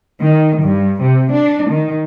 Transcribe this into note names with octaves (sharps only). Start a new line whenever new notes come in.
D#3
G2
C3
D4
D#3